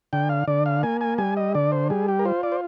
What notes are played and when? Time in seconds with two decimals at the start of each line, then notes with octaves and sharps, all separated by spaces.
0.13 D3 G5
0.29 F5
0.48 D3 D5
0.66 F5
0.83 A#3 G#5
1.01 G#5
1.18 G3 G#5
1.37 D#5
1.55 D3 D5
1.72 C5
1.90 G3 G#4
2.08 G4
2.19 A#4
2.25 F4 C5
2.43 D5
2.52 C5